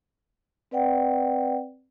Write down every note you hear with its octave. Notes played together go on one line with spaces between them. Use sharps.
C4 B4 D5 F#5 G5